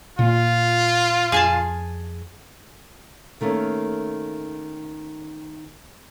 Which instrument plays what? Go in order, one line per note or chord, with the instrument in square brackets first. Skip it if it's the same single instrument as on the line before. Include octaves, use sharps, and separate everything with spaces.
[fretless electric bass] A#2 A#3 [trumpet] F4
[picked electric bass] F2 [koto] G#4 G#5 A5
[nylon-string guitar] D#3 A3 A#3 C#4